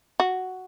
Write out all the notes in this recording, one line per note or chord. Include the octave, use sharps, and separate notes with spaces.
F#4